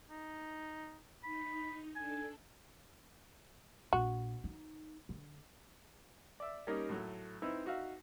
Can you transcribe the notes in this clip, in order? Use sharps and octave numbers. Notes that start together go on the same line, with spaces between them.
D#4
D#4 B5
D4 A4 G#5
A#1 F#4
D#4
D3
D5 E5
G3 A#3 C#4 D#4 A#4 D#5
A2 F#3 A3
C4 D#4 E4 B4 E5
D#4 F#4 E5 F5